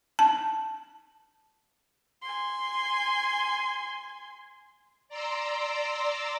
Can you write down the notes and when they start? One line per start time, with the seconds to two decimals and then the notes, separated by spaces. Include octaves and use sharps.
0.19 A5
2.22 G#5 C6
5.09 D5 A#5 C6 D6 E6